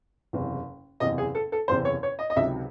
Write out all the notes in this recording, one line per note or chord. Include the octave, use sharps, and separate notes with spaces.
F#1 E2 C3
F#1 E2 C3 D#5
G#4
A4
A4
F#1 E2 C3 C5
C#5
C#5
D#5
D#5
C#2 C3 D#3 F#3 E5